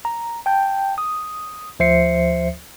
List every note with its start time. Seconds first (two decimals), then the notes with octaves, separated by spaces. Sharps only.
0.05 A#5
0.46 G5 A5 G6
0.98 D#6
1.79 D2 F3 C5 E5 C7 C#7